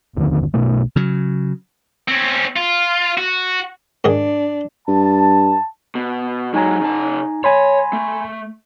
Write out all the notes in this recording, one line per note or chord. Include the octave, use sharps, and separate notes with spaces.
G1 D#2 D3 D#3
B1 B2 A3
C#3 F#3
C4 C#4
F4
F#4
G#2 D#3 D4 G#4
G2 A5
B2
F#3 G#3 D#4 G#5 A#5
C#3 A5
C#5 G#5 B5 C6
A3